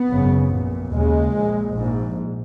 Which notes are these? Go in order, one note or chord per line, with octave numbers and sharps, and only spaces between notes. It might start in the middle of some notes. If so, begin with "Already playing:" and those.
Already playing: B3
G#1 F#2 C#3
A#1 A#2
D#2 C#3 G#3
A#1 A#2
A#1 G#2